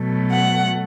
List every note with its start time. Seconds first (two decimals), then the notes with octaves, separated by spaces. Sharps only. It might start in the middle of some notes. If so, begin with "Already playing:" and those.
Already playing: B2 F#3 A3
0.31 F#5